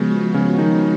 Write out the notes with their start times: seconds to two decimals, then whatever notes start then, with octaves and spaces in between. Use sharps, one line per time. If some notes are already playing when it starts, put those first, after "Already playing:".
Already playing: C#3 F3 G#3 B3 C#4 F#4
0.34 C#3 C#4
0.58 D#3 D#4